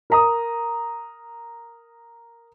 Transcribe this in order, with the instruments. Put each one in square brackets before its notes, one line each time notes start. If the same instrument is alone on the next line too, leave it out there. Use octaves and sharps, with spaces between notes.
[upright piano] A#4 A#5 D#6